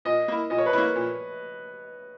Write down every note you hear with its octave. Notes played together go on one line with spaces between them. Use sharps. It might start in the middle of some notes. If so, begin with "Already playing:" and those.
A#2 D#5
A#3 E4
A#2 D#5
C#5
B4
A#3 E4 C#5
A#2